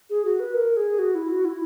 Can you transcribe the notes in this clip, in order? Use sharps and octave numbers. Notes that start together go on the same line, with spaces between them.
G#4
F#4
B4
A#4
G#4
F#4
E4
F#4
E4